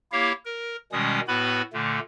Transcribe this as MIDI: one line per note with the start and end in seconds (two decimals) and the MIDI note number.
0.12 0.32 58
0.12 0.32 64
0.12 0.32 67
0.12 0.32 73
0.12 0.32 77
0.45 0.76 70
0.92 1.20 47
0.92 1.20 51
0.92 1.20 55
0.92 1.20 56
0.92 1.20 61
0.92 1.20 87
1.28 1.62 45
1.28 1.62 59
1.28 1.62 66
1.28 1.62 71
1.28 1.62 83
1.73 1.99 46
1.73 1.99 50
1.73 1.99 57